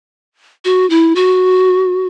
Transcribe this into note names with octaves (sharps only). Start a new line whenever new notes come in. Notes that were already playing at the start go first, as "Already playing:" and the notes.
F#4
E4
F#4